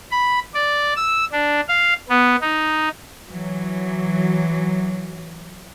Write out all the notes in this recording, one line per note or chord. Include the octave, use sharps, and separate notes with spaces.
B5
D5
E6
D4
F5
B3
D#4
E3 F#3